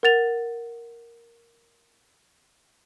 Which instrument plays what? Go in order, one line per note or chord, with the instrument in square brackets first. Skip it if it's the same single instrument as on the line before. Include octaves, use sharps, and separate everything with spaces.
[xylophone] A#4 F#5 A6 F7